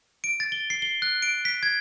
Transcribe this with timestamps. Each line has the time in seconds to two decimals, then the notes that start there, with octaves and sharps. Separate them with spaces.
0.24 D7
0.40 A6
0.52 G7
0.70 C7
0.82 G7
1.02 F#6
1.22 D7
1.45 B6
1.63 G#6